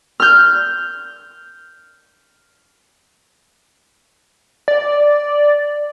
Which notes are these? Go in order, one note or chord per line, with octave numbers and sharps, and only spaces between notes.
F6 G6
D5